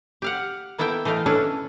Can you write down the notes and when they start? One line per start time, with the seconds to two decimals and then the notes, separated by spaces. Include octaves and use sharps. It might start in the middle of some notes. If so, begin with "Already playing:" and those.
0.22 G4 F5 F#5
0.78 A#3 B3 E4 A4 E5 G5
1.05 E3 A3 D#5 F5 G5
1.26 C#4 D4 E4 A4 B4